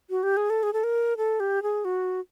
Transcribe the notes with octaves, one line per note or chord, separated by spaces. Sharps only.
F#4
G4
G#4
A4
G#4
A4
A#4
A4
G4
G#4
F#4